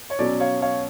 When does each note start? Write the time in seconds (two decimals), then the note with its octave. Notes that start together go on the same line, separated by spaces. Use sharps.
0.10 C#5
0.19 B2 F#3 C#4 D5
0.40 C#5 F5
0.62 C#5 F5